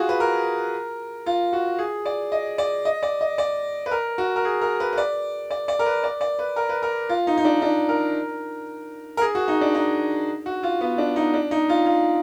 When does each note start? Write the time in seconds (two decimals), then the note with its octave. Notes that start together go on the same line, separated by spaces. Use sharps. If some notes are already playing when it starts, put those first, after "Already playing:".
Already playing: F4 F#4 G#4
0.09 B4
0.20 A#4
1.26 F4
1.53 F#4
1.79 G#4
2.05 D5
2.32 D#5
2.58 D5
2.85 D#5
3.03 D5
3.21 D#5
3.38 D5
3.86 B4
3.91 A#4
4.18 F#4
4.36 A#4
4.45 G#4
4.61 A#4
4.80 B4
4.93 B4
4.98 D5
5.51 D5
5.68 D5
5.79 A#4
5.86 B4
6.04 D5
6.21 D5
6.39 B4
6.56 A#4
6.69 B4
6.83 A#4
7.09 F4
7.27 D#4
7.37 D#4
7.45 D4
7.62 D4
7.89 A#4
9.17 A#4
9.21 G#4
9.35 F#4
9.48 D#4
9.61 D4
9.74 D#4
10.46 F#4
10.63 F4
10.81 B3
10.98 D4
11.16 D#4
11.34 D4
11.51 D#4
11.69 F4
11.86 F4